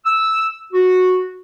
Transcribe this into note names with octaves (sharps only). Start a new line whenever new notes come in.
E6
F#4